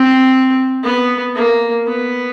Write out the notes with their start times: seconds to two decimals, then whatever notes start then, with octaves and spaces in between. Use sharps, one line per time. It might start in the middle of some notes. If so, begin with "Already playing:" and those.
Already playing: C4
0.84 B3
1.35 A#3
1.87 B3